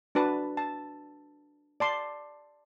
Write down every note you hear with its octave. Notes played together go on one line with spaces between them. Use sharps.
D4 F#4 B4 A5
A5
D5 A5 C6